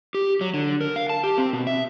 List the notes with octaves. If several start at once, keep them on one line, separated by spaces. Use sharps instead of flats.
G4
F#3
D3
A#4
F5
A5
G4
C4
B2
E5